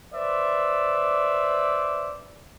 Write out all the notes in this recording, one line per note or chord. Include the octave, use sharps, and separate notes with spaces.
B4 C5 D5 E5